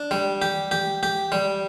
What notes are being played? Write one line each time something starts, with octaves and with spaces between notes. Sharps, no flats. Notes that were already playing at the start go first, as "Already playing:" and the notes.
Already playing: D4
G3
G4
G4
G4
G3